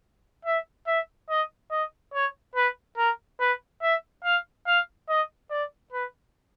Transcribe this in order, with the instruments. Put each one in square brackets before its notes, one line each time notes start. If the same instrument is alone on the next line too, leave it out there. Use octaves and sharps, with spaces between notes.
[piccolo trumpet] E5
E5
D#5
D#5
C#5
B4
A#4
B4
E5
F5
F5
D#5
D5
B4